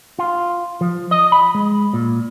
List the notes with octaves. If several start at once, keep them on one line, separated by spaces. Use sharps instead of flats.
F4
F3
D#5
B5
G#3
A#2